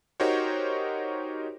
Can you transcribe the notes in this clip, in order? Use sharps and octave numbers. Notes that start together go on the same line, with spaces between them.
D#4 F#4 G4 A#4 C5 C#5